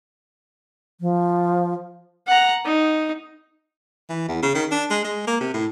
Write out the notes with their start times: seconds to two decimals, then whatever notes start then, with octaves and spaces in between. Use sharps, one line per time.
1.01 F3
2.27 F#5 A#5
2.65 D#4
4.09 E3
4.28 E2
4.42 C#3
4.55 D#3
4.71 D4
4.90 G#3
5.04 G#3
5.27 A#3
5.41 C3
5.54 A2